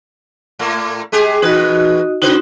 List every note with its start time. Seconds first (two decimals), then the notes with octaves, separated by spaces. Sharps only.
0.59 A2 A3 A#3
1.12 G#3 G4 G#4
1.42 E2 B2 D#4 F#4 B4 D#5
2.22 C#3 D#4 E4 F#4 B4 C5